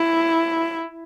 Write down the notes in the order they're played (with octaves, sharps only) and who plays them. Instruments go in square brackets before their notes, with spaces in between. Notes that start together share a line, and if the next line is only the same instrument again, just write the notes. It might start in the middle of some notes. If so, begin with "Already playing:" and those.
Already playing: [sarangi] E4